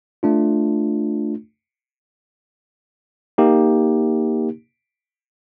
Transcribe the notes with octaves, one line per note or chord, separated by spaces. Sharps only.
A3 D4 F4
A#3 D#4 G4